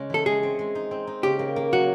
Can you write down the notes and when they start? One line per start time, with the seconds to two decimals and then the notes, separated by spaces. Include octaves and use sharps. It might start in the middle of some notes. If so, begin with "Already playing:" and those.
Already playing: C#3 G#3
0.10 E3 A4
0.26 G#3 G#4
0.43 C4
0.59 G#3
0.75 D#4
0.91 C4
1.07 D#4
1.23 C#3 G4
1.39 A#3
1.56 A#3
1.72 F#3 F#4